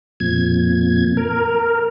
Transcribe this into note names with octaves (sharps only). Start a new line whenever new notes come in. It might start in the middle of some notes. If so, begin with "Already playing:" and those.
F2 A#2 G#6
A#4